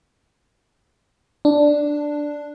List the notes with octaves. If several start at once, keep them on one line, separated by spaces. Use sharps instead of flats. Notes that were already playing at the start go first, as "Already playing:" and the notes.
D4